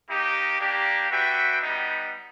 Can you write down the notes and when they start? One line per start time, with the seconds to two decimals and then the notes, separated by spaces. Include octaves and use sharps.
0.09 A#3 D#4 G4
0.59 A#3 D4 G4
1.10 D4 F#4 B4 E5 G5
1.62 G3 B3 D#4